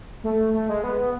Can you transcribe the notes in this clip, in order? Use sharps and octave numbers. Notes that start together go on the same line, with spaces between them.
A3
A3
G#3
B3